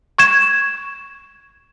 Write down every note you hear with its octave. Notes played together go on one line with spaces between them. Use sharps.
C#6 G#6 E7